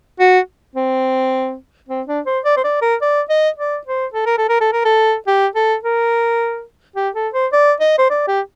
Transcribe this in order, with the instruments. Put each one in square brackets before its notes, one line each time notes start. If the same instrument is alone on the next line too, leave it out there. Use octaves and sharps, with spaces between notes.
[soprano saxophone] F#4
C4
C4
D4
C5
D5
C5
D5
A#4
D5
D#5
D5
C5
A4
A#4
A4
A#4
A4
A#4
A4
G4
A4
A#4
G4
A4
C5
D5
D#5
C5
D5
G4